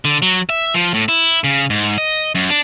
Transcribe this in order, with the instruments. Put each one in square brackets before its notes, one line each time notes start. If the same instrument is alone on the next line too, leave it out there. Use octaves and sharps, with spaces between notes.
[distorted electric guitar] D3
F#3
E5
F3
A2
E4
C#3
G#2
D#5
F#2
D4